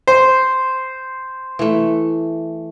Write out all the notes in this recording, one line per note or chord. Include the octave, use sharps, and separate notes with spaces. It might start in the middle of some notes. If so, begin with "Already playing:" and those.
C5
E3 A3